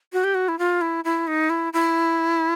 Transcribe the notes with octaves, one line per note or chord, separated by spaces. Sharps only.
F#4
G4
F#4
E4
F4
E4
E4
D#4
E4
E4